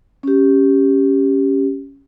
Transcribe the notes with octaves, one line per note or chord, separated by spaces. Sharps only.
C#4 G4